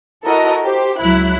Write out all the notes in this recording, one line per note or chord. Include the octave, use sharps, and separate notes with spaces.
E4 F#4 A4 A#4 D#5
G4 C5
C#2 F#3 E4 F#6